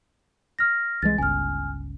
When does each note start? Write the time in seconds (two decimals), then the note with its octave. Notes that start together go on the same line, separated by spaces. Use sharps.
0.59 F6 A#6
1.02 C2 E3 G#3 A6
1.18 G1 C#2 G#5 F6